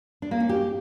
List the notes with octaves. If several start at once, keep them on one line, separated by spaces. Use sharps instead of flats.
D4
A#3
C#4
G4